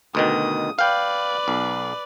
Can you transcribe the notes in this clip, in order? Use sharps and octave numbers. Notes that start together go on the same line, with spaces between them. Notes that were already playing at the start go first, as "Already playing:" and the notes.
D2 B2 D#3 D#6
B4 D5 F5 G5
B1